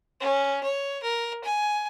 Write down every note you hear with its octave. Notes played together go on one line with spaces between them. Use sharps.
C#4
C#5
A#4
G#5